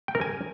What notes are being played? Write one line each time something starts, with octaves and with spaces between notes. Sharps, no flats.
G5
A#4
G#5